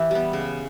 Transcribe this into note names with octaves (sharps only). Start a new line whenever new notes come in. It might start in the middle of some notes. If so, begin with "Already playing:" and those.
Already playing: E3 E4 G4
G3 B3
C#3